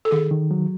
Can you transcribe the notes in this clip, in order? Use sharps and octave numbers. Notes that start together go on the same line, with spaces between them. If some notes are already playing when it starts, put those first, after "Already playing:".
A4
D#3 G#4
D#3
F#3